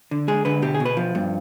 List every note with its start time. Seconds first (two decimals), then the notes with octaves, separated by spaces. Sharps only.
0.11 D3
0.28 G#3 G#4
0.45 D3 B4
0.62 B2 G4
0.74 G#4
0.80 B2
0.85 B4
0.97 F3
1.15 G2